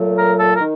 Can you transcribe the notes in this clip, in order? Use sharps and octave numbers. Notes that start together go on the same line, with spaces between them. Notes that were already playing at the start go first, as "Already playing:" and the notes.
Already playing: A#2 F#3 A3
A#4
A4
A#4
D#3